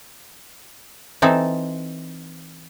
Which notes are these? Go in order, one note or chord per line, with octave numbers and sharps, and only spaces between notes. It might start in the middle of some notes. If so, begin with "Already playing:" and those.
E3 C4 D#4 A4